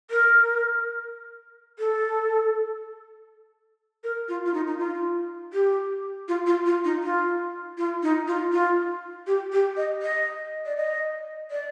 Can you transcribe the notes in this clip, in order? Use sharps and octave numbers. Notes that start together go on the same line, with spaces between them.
A#4
A4
A#4
F4
F4
D#4
D#4
F4
G4
F4
F4
F4
D#4
F4
F4
D#4
F4
F4
G4
G4
D#5
D#5
D5
D#5
D5